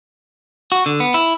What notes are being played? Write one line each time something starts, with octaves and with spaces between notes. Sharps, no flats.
F#4
D3
B3
E4